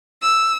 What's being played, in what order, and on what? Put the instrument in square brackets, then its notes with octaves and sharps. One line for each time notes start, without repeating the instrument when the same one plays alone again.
[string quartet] E6